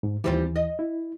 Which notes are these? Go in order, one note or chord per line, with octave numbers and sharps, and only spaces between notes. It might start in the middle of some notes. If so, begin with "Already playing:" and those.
G#2
D#2 E3 G3 C4 F4
D#5
E4